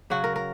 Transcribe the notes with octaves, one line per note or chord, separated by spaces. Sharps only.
C#3 F#3 F#4
A#4
A#4